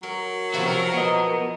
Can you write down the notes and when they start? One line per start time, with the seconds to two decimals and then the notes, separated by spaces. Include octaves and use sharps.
0.03 F#3 A#4
0.54 C3 F3 E4 F#4 E5
0.66 A#4
0.94 B3 D#5